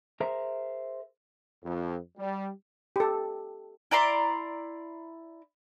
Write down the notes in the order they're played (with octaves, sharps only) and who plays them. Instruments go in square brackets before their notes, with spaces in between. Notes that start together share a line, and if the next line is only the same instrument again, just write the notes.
[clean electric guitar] G#4 A#4 C5 E5 A#5
[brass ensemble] F2
G3
[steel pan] G4 A4
[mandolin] E4 D5 A#5 C6